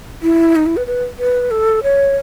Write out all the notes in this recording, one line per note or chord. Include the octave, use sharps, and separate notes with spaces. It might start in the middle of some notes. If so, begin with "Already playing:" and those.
E4
D#4
E4
B4
B4
B4
A4
C#5